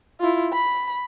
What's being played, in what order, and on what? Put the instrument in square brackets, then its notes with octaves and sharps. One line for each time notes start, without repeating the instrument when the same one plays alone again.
[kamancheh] E4 F4
B5